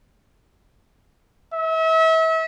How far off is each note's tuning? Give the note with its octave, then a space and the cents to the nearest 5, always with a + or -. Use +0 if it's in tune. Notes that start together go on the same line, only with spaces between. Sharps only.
E5 -35